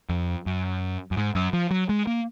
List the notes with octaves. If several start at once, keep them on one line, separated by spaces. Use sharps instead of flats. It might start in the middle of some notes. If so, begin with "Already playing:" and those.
F2
F#2
F#2
G#2
F#2
F3
F#3
G#3
A#3